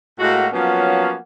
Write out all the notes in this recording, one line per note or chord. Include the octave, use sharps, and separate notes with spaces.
A2 G#3 A#3 F#4
F3 F#3 A#3 B3 C#4 F#4